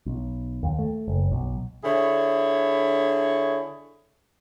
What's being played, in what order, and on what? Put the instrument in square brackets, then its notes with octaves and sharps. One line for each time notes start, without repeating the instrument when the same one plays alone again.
[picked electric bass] B1
D#2
A3
F#1
B1
[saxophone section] D3 E4 G#4 C#5